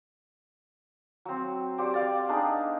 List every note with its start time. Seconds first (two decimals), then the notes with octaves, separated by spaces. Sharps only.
1.25 F#3 C4
1.78 F#4 G4 C5 D5
1.94 D5 F5 G5
2.29 B3 D4 D#4 G#4